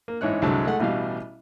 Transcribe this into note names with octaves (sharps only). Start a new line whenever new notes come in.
A#3
A1 G#2 E4 C#5 F#6
C2 D3 F#3 G#3 A5
G#3 A3 F#5
A1 B2 G3 F5